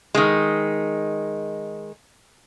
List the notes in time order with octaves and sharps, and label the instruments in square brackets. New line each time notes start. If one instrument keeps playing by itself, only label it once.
[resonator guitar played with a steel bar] D#3 G#3